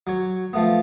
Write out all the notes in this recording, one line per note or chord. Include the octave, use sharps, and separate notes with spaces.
F#3 C#5
F3 A3 B3